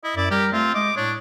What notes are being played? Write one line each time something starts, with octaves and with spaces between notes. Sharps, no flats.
E4 D#5
F#2 E4 D5
G3 G4 A#4
A3 C4 F4
G#3 D#5 D6
A2 D4 C#5